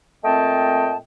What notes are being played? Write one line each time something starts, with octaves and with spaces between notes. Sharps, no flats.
A#2 A3 C4 D#5 G5 A5